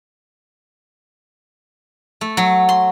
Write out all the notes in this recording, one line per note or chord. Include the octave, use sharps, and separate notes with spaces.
A3
F#3
C6